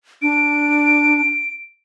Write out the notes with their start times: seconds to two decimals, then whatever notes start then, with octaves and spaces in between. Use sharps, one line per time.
0.22 D4 D7